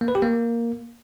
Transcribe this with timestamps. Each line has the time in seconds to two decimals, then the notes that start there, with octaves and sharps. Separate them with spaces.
0.01 A#3
0.08 B4
0.15 G4
0.22 A#3